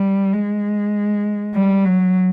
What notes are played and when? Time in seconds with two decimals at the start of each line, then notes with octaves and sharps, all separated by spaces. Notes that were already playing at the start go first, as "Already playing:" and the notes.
Already playing: G3
0.33 G#3
1.55 G3
1.85 F#3